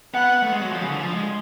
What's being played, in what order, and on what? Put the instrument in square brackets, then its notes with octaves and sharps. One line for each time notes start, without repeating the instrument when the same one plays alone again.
[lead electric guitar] B3 [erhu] F#5
[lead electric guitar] A3
G#3
F#3
F3
C#3
D3
F3
G#3